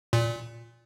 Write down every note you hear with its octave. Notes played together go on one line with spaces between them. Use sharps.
A#2